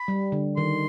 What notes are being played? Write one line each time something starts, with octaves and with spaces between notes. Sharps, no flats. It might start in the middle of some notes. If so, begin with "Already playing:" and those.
Already playing: B5
G3
D3
D#3 C6